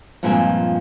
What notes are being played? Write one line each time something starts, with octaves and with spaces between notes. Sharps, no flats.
G2 A#2 F3 G#3 C4 G#5